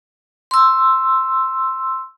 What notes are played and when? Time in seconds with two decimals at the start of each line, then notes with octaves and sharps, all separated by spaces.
0.51 C6 E6